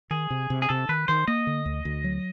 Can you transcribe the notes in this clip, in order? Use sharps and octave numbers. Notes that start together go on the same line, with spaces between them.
D#3 G#4
C3
C3
G#4
C3 A4
D#3 B4
D#3 C5
A#3 D#5
D3
D2
D2
F#3